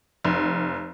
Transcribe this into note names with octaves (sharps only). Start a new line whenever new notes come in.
F1